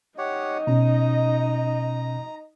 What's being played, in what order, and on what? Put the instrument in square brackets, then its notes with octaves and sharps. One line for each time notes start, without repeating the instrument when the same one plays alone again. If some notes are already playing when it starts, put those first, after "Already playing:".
[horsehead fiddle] D#4 D#5 [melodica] G4 C#5 F#5
[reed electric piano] B2 C#4 [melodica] A#5